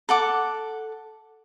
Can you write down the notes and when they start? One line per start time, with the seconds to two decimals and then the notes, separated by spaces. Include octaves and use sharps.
0.09 A4 F#5 D6